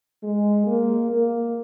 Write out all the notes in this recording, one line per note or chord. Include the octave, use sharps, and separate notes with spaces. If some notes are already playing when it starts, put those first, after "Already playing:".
G#3
A#3
A#3